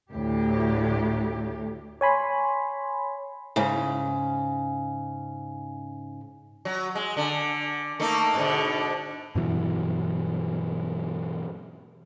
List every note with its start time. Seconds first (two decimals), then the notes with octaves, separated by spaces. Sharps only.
0.10 D2 A2 G4
2.01 C#5 G#5 B5 C6
3.56 G#2 C#3
6.65 F#3
6.95 G#3
7.17 D3
8.00 A3 A#3 D#4
8.34 G#2 B2 D3
9.35 G2 B2 E3 F#3